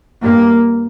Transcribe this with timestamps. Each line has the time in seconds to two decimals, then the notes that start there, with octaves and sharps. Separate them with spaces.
0.23 G2 A#3